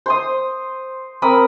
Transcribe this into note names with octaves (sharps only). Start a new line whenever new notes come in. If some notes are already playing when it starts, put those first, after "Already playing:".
C5 C6 D#6
C4 A#4 B5 D#6